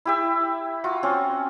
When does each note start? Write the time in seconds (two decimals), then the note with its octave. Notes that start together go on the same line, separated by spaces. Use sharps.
0.05 E4 G4 E5
0.84 F4 F#4
1.03 C4 C#4 F#4